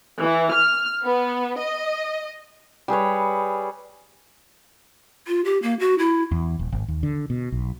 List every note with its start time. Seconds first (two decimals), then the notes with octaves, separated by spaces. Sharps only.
0.19 E3
0.52 F6
1.04 B3
1.59 D#5
2.88 G3 G#4 B4 C#5
5.27 F4
5.45 G4
5.63 A#3
5.80 F#4
5.99 E4
6.31 E2
6.59 D#1
6.72 G#1
6.88 D#2
7.03 D3
7.30 B2
7.52 B1